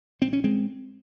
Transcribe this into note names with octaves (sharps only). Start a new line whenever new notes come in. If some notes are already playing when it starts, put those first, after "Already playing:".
A#1 C4
C#4
G#3 C4